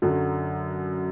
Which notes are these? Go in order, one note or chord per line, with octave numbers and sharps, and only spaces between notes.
F#2 D3 F#3